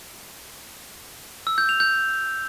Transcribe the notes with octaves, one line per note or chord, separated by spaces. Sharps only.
E6
G6
F7
G6